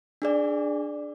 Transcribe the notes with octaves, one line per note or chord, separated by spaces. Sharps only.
D4 G#4 D5